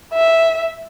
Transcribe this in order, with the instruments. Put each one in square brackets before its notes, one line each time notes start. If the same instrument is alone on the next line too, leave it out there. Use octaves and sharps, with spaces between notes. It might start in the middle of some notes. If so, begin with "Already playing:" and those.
[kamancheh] E5